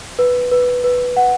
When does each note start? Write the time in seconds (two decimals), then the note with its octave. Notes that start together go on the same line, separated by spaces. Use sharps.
0.19 B4
0.52 B4
0.84 B4
1.17 F#5